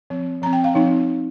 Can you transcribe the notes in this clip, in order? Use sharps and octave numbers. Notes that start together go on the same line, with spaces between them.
F3 C4
F3 C4 A#5
G5
F5
F3 C4 D#4